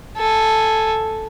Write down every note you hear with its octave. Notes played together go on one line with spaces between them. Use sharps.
A4 G#5